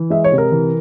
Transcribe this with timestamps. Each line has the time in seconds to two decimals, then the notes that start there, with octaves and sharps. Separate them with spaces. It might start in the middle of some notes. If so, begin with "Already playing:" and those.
Already playing: E3
0.10 G#3 E5
0.24 C#5
0.32 C3
0.38 A#4
0.52 E3